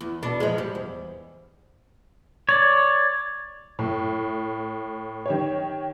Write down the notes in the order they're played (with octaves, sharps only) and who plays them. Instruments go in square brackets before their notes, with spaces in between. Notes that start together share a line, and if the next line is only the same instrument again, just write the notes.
[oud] E2
B2 D4
F3 G#3
G3
E2
[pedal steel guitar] C#5 D5
[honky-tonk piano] A2
D#3 G4 C#5